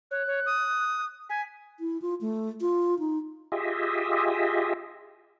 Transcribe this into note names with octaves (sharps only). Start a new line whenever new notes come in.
C#5 F#6
C#5
D#6
G#5 B6
E4
F4
A3
F4
D#4
F4 G4 G#4 D#5 E5